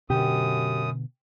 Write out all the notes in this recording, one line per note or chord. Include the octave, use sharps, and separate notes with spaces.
F#2 B2 D3 G4 D#6